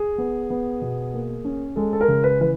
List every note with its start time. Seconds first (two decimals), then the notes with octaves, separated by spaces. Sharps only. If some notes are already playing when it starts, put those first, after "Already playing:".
Already playing: G#4
0.18 B3
0.50 B3
0.81 B2
1.14 A#3
1.45 C#4
1.76 G#3 A4
1.93 A4
2.01 A#4
2.08 C#3
2.24 B4
2.40 E3 B4